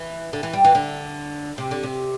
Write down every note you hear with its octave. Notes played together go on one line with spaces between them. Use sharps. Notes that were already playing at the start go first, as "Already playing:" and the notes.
Already playing: E3
D3
E3
G3
E3
D3
C3
D3
C3